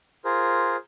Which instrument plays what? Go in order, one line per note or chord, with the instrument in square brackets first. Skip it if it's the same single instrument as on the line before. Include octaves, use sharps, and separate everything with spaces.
[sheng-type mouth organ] F4 G#4 A#4 C5